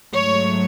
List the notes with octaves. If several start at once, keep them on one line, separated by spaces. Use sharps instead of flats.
G#2 F#3 A3 C#5